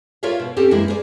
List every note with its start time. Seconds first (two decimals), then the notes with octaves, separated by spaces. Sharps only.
0.23 F4 A#4 C#5 D5 E5 F5
0.40 B2
0.56 C4 C#4 G4 A4
0.71 F#2 E3 G#3 A#3 E4
0.88 G#4 A#4 D5